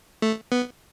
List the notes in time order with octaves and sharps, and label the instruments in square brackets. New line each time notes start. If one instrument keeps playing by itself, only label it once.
[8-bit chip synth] A3
B3